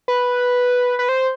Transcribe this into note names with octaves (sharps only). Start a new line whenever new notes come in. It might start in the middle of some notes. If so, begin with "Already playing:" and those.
B4
B4
C5